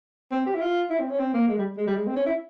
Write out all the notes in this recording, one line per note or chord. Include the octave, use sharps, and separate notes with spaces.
C4
G4
E4
F4
E4
C4
C#4
C4
A#3
G#3
G3
G#3
G3
G#3
C4
C#4
E4